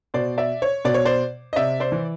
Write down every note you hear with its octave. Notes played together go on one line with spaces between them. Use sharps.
B2 C5 D5
D5 E5
C#5
B2 D5
C#5
C5 D5
D#5
C3 D5 E5
C5 D5
E3